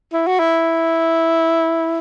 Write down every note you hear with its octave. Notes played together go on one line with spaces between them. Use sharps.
E4
F#4
E4